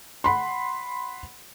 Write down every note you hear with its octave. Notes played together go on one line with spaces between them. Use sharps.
F#5 B5 C6